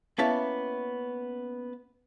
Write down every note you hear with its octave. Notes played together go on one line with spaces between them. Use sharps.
A#3 B3 C#4 E4 E5 A5